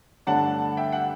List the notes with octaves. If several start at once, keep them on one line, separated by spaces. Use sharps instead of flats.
G2 D3 A3 D4 F#5 A5
E5 G5
F#5